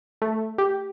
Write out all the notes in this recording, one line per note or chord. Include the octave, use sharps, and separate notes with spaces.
A3
G4